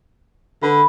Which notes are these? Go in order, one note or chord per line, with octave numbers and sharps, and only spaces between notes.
D3 B4 B5